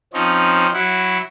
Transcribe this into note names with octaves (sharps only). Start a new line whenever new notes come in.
F3 C4 C#4 D#4
F#3 E4 F#4